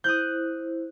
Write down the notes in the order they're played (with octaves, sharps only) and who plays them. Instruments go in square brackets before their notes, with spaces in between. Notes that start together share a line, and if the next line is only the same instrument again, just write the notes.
[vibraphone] E4 C5 [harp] D#6 F#6 G6